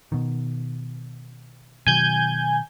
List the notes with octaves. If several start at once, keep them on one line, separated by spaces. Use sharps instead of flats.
B2 D#3
B2 D#3 F#3 G#5 G6 G#6